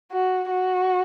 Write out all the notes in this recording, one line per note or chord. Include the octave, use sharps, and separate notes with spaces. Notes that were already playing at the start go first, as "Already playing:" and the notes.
F#4
F#4